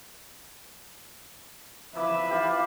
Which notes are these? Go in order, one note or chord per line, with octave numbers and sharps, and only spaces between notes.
F3 E4 B4 E5 D6
E4 F4 G4